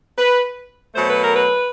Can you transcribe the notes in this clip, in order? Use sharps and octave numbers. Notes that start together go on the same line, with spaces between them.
B4
B2 F#3 A3 C5
B4
A#4
B4